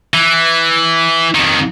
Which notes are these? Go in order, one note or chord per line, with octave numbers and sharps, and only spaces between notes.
E3
F2 D#3